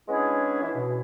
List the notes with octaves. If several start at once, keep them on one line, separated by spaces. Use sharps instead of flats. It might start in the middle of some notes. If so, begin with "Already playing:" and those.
G#3 B3 C#4 D4 E4 G#4
E3 E4
B2